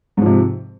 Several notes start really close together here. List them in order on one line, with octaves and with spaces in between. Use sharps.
G#2 F3 C3